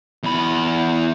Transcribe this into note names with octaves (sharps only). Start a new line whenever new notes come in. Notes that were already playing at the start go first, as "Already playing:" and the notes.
E2 B5